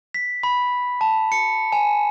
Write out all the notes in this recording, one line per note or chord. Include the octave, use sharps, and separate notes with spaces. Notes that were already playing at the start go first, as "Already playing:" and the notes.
B6
B5
A5
C#7
G#5